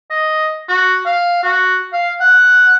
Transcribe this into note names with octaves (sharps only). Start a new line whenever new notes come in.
D#5
F#4
F5
F#4
F5
F#5